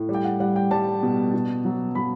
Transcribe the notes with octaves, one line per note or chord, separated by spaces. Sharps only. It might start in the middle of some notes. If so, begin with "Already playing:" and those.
Already playing: A2
G3
G5
F#5
G3 F#5
G5
G3 A5
B2
B2
F#3
F#3 B5